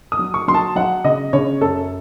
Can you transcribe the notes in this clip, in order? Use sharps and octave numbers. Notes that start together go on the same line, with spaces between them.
D#6
F#3
C#6
F#3 C6
A5
F#3 F#5
C#3 D#5
C#3 C#5
F#2 A4